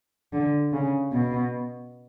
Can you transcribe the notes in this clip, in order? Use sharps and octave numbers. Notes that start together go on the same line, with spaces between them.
D3
C#3
B2